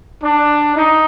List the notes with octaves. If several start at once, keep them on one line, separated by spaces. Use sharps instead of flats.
D4
D#4